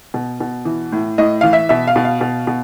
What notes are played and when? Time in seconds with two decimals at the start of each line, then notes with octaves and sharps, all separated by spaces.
0.14 B2
0.41 B2
0.65 E3
0.92 A2
1.18 A2 D#5
1.41 E3 F5
1.53 E5
1.69 B2 E5
1.87 F5
1.96 B2
2.05 F5
2.21 B2
2.47 B2